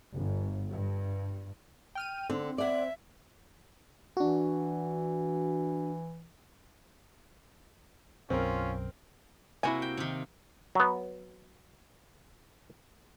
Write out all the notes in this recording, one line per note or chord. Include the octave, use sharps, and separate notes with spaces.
G1
G2
G5 F6 D#7
D3 C4
D5 E5 F#5
E3 D4 F#4
B1 F#2 C4 C#4 F4 A#4
C3 A#3 E4 F#4 G#5
G5
C3 D#3
F#3 B3